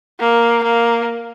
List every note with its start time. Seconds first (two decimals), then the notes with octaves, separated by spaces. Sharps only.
0.20 A#3
0.64 A#3